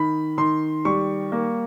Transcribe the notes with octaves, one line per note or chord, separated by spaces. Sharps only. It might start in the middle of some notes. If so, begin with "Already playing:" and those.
Already playing: D#3 B5
D#3 C6
G3 C#6
A#3